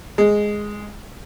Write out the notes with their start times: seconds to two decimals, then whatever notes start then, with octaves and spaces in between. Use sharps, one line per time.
0.18 G#3